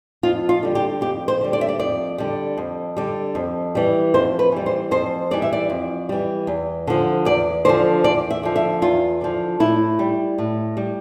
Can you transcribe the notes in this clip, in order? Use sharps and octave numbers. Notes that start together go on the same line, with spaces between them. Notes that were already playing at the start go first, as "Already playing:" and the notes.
F2 F4
F4
D3 G3
G4
F2 G4
C5
D3 G3
D5
E5
D5
F2 D5
D3 G3
F2
D3 G3
F2
E3 G3
F2 C5
B4
E3 G3
C5
F2 C5
E3 G3 D5
E5
D5
F2
E3 G3
E2
D3 F3
E2 D5
D3 F3 C5
E2 D5
E5
D3 F3
E5
E2 F4
D3 F3
A2 E4
G3
A2
G3